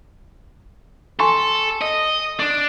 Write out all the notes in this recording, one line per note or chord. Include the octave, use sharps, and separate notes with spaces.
A4 G#5 C6 C#6
D#5
D4